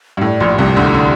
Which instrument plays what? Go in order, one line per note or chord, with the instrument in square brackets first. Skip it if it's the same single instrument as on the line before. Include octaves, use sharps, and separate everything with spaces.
[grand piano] G2
[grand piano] A2 [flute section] E4 G4 D5
[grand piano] A#1 A#2
C2 C3
D2 D3
D3